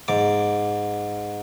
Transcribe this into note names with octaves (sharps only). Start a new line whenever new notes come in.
G#2 D6